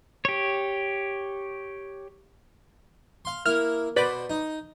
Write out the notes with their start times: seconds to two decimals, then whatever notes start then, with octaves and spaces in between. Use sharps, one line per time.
0.25 G4 C#5
3.25 F5 C6
3.46 A#3 E4 F6
3.96 B2 B4 C5 D5 B5
4.30 D#4